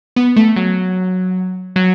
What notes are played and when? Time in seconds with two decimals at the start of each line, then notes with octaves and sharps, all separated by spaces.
0.16 B3
0.36 A3
0.56 F#3
1.76 F#3